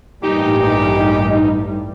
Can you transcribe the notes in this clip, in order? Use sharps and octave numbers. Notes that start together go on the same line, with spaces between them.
A1 G2 A#2 G3 D#4 G4